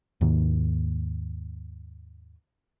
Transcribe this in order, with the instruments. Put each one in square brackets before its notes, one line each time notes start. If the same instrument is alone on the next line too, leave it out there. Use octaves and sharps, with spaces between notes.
[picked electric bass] D#2 G#2 D#3 A#3